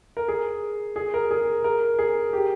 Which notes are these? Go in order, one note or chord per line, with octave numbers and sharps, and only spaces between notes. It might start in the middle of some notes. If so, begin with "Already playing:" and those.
A#4
G#4
G#4
A#4
G#4
A#4
G#4
G4